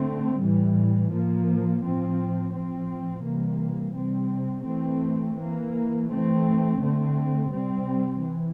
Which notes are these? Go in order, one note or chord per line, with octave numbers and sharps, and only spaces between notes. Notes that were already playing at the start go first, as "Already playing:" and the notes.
Already playing: D3 A3 C4
A2 E3 G3
A2 F3 A#3
A2 F3 C4
A2 F3 C4
C3 E3 G3 A#3
C3 G3 C4
E3 A3 C4
E3 A#3
E3 A3 C4
D3 A3 C4
C3 G3 C4
E3